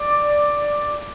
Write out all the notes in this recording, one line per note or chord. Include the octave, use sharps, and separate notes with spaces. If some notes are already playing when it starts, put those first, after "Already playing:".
Already playing: D5